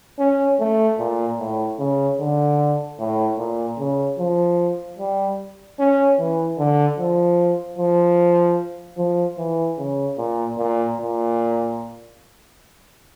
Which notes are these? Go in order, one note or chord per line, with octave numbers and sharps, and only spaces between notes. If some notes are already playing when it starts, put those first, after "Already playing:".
C#4
A3
A#2
A2
C#3
D3
A2
A#2
C#3
F3
G3
C#4
E3
D3
F3
F3
F3
E3
C#3
A#2
A#2
A#2